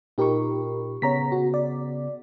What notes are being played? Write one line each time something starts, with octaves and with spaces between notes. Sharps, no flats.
A#2 D#4 G4 A#4 B5 C#6
C#3 B3 C#5 A#5 B6
F#4
D5